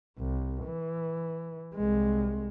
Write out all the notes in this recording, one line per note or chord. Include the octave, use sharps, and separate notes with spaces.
C2
E3
C2 G#3